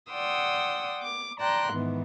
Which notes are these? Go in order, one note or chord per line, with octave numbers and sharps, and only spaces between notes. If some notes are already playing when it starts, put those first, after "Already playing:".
D5 F#5 G5 C6 D#6 E6
D6
D5 G5 A5 A#5 C6 F#6
G#2 D#3 E3 B3